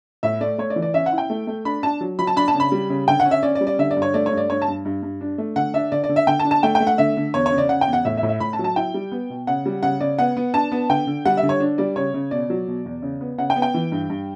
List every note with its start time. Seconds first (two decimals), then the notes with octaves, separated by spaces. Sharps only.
0.23 A2 E5
0.41 A3 D5
0.58 A3 C#5
0.70 D5
0.76 E3
0.82 D5
0.94 C#4 E5
1.06 F#5
1.12 E4
1.18 G5
1.30 A3
1.47 A3
1.65 D4 B5
1.83 D4 A5
2.01 F#3
2.19 F#3 B5
2.27 A5
2.36 D4 B5
2.48 A5
2.54 C#3
2.60 B5
2.72 G3
2.90 C#3
3.08 D3 G5
3.20 F#5
3.25 C#4
3.31 E5
3.43 C#4 D5
3.55 D5
3.61 G3
3.67 D5
3.79 D3 E5
3.91 D5
3.96 G2
4.02 C#5
4.14 A3 D5
4.26 C#5
4.32 G2
4.37 D5
4.50 G2 C#5
4.62 A5
4.68 G2
4.85 G2
5.03 G2
5.21 D4
5.38 A3
5.56 D3 F#5
5.74 D4 E5
5.92 D3 D5
6.04 D5
6.09 D3
6.16 E5
6.27 D3 G5
6.40 A5
6.45 D4
6.51 A5
6.63 A3 G5
6.75 G5
6.80 A3
6.87 F#5
6.98 D3 E5
7.17 D3
7.34 E2 C#5
7.46 C#5
7.52 C#3
7.58 D5
7.69 C#3 F#5
7.81 G5
7.87 E2
7.93 F#5
8.05 A2 E5
8.17 E5
8.23 A2
8.29 E5
8.40 A2 B5
8.53 A5
8.59 F#3
8.64 A5
8.76 E4 G5
8.94 G3
9.12 B3
9.30 B2
9.47 C#3 F#5
9.66 G3
9.83 C#3 F#5
10.01 C#3 D5
10.18 B3 F#5
10.37 B3
10.54 D4 A5
10.72 B3
10.90 D3 G5
11.07 D3
11.25 G3 F#5
11.37 E5
11.43 D3
11.49 C#5
11.60 D4
11.78 G3 D5
11.96 C#3 C#5
12.14 C#3
12.31 B2 D5
12.50 F#3
12.68 B2
12.86 E2
13.02 C#3
13.21 B3
13.38 C#3 F#5
13.50 G5
13.56 B3
13.62 G5
13.74 E3
13.92 G2
14.10 G2